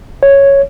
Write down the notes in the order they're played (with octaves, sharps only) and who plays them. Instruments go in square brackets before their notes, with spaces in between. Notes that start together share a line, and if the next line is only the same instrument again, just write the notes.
[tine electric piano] C#5